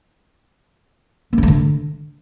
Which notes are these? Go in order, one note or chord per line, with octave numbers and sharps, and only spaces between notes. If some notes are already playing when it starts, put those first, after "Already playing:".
A#3
C#4
A3
D3